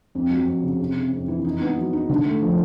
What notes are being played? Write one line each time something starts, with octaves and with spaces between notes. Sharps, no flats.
F2
F#3
F2
C#3
C3
C3
F2
E3
D#4
B3
F#3
D#4
D3
A3
F3